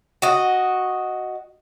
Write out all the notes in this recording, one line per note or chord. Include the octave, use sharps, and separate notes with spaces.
F#4 D#5